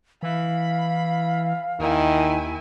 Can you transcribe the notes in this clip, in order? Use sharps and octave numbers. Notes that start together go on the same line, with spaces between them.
E3 F5 B5
D#2 D#3 E4 G#5